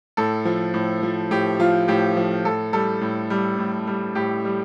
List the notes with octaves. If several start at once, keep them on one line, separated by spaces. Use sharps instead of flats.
A2 A4
F3
A2
F3
A2 G4
F3 F4
A2 G4
F3
A2 A4
G3 A4
A2
G3
A2
G3
A2 G4
G3